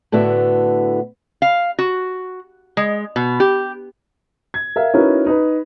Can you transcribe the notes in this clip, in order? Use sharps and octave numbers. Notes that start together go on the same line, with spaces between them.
A2 D3 B3 F#4 E5
F5
F#4
G#3
B2
G4
G#6
A#4 E5 F5
C#4 D#4 E4 F#4 A#4 B4
D#4 B4